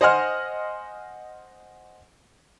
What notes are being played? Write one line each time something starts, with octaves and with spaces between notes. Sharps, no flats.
C5 D#5 F#5 G#5 C6 F6